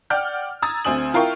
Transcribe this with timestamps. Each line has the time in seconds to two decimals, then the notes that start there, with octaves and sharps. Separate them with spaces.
0.10 D5 F#5 G5 F6 G6
0.62 A#5 D#6 E6 G#6 A6
0.85 D2 C4 G#5 D#6 F#7
1.14 E4 F4 A#4 F5 G5 C#6